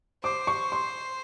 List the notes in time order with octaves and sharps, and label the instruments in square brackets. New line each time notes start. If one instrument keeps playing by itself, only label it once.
[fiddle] C5 [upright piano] D6
[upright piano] C#6
C6